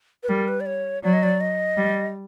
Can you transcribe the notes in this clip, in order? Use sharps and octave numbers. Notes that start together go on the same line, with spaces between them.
B4
G3 A#4
B4
D5
C#5
F#3 D5
D#5
D5
D#5
G3